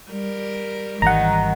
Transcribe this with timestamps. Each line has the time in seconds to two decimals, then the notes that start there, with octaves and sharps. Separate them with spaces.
0.10 G3 A#4
1.02 G#1 D#3 E3 G3 F#5 A#5